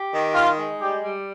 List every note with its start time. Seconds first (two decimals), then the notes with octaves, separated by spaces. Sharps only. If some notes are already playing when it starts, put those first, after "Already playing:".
Already playing: G4
0.12 D#3
0.35 D#4 F4
0.57 G#3
0.81 G3 G4
1.03 G3